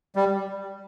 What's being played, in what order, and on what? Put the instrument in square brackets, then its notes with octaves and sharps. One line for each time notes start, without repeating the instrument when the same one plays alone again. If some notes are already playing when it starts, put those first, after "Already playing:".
[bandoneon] G3